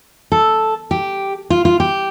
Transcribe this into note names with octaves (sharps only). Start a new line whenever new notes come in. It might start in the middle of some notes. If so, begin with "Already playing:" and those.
A4
G4
F4
F4
G4